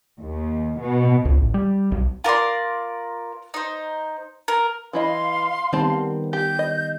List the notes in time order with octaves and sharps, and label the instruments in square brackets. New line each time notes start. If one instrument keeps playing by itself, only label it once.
[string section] D#2
B2
[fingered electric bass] C#2
A1
G3
B1
[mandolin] F4 A#4 D5 C6
D#4 C5
A#4
[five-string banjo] E3 E4 D#5 [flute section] F5 C6
[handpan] D#3 G3 B3 [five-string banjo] C4 A5
[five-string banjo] G4 [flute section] G6
[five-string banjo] D#5